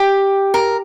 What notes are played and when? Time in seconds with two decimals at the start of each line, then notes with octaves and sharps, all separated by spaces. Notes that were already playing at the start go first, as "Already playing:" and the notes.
Already playing: G4
0.54 A#4